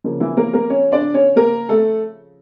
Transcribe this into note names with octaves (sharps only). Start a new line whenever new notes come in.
C#3 F3 A#3
E3 E4
A#3 A#4
A#3 A#4
C#4 C#5
D4 D5
C#4 C#5
A#3 A#4
A3 A4